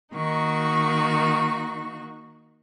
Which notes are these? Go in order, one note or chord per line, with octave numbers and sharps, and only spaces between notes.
D#3 A#3 D#4 F#4 C#6